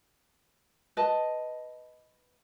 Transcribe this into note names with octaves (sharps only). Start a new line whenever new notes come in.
B4 D#5 A5